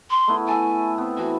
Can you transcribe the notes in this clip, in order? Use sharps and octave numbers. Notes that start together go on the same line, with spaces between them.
C6
A3 B3 E4
E5 G#5 A5
B3 C4
E3 F#4